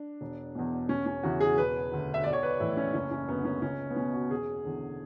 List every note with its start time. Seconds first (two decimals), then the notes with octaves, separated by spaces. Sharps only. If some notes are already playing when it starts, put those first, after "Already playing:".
Already playing: D4
0.21 E1
0.55 E2 B2
0.89 E1 C#4
1.06 C#4
1.23 E2 C#3 E3 F#4
1.40 G#4
1.58 E1 B4
1.92 D2 D3
2.14 E5
2.23 B1 D5
2.33 C#5
2.43 B4
2.60 A2 E3 E4
2.77 C#4
2.94 F#1 C#4
3.11 C#4
3.28 F#2 D3 B3
3.45 C#4
3.62 C#2 C#4
3.90 B3
3.96 B2 C#4
4.13 F#4
4.31 E1 G#4
4.64 E2 D3